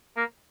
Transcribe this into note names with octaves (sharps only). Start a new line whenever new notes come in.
A#3